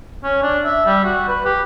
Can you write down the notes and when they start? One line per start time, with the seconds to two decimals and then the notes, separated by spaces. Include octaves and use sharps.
0.24 C#4
0.43 D4
0.65 E5
0.86 G3
1.04 F#4
1.28 B4
1.45 G4